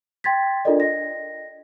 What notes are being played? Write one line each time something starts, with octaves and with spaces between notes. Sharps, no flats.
G5 C6 G#6 A6 B6
D4 F4 A4 A#4 D5 D#5
D#5 A#6